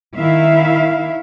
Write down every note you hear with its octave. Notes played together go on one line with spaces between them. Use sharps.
D#3 E4 E5 F5